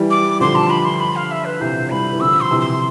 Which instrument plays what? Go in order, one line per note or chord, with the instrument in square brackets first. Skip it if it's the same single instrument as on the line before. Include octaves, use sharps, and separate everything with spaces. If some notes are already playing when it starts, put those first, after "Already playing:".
Already playing: [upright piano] E3 G3
[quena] D6
[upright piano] D3 F3 [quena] C6
[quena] A5
B5
C6
B5
F5
E5
B4
[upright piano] C3 E3 [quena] C5
[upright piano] E3 G3 [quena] B5
[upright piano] E3
[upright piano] D3 F3 [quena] E6
[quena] C6
[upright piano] C3 E3
[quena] C6